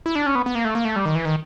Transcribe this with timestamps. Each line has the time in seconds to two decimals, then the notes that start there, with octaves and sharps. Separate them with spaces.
0.06 E4
0.15 D4
0.26 C#4
0.35 B3
0.46 B3
0.55 A#3
0.65 A3
0.75 A#3
0.85 A3
0.96 G3
1.05 D#3
1.15 E3
1.25 D#3